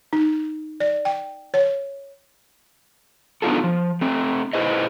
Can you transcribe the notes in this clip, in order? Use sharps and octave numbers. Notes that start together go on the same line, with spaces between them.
D#4
D5
G5
C#5
B3 D4 D#4 F4 F#4 A4
F3
A3 C4
E4 G#4 B4 C5 D#5